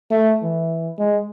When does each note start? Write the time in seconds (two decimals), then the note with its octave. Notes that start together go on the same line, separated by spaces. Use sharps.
0.11 A3
0.43 E3
0.99 G#3